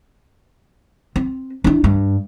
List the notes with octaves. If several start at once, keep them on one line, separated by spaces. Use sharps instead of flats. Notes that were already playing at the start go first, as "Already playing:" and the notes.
C4
D4 E4
G2